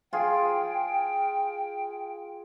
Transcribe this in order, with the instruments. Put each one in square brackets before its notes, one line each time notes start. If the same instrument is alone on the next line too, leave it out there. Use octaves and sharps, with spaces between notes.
[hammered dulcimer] F4 G#4 [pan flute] G5